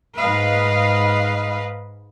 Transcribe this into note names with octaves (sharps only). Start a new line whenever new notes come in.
G#2 B4 D#5 F5